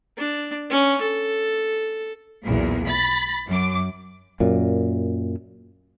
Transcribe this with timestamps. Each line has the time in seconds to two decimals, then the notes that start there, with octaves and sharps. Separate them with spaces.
0.17 D4
0.70 C#4
1.01 A4
2.43 B1 E2 A#2
2.86 B5 A6
3.48 F#2 D6
4.40 F#2 A#2